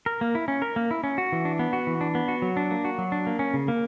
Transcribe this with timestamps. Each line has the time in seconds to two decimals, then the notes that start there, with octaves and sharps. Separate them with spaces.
0.06 A#4
0.21 A#3
0.35 E4
0.48 C#4
0.62 A#4
0.76 A#3
0.91 E4
1.04 C#4
1.18 F#4
1.32 E3
1.45 D4
1.59 B3
1.73 F#4
1.87 E3
2.01 D4
2.15 B3
2.28 F#4
2.42 F#3
2.57 D4
2.71 A#3
2.85 F#4
2.98 F#3
3.12 D4
3.27 A#3
3.39 C#4
3.54 C#3
3.68 A#3